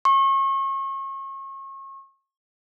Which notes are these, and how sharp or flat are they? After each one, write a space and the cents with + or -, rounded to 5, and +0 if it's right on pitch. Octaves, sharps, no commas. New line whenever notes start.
C#6 -35